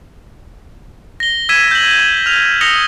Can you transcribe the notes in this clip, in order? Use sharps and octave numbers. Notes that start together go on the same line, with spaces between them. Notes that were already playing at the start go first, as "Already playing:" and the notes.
A#6 G7
E6 G#6 B6 D#7 E7
G6 F#7
F6 F7
D#6 A#6 C#7 F7 G7